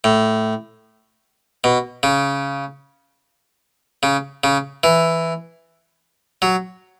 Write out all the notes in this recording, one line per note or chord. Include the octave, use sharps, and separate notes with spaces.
A2
B2
C#3
C#3
C#3
E3
F#3